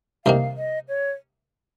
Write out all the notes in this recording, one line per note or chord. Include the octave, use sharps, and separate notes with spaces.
C2 C3 D#3 A#3 F5
D#5
C#5